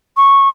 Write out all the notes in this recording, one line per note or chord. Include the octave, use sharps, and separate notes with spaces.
C#6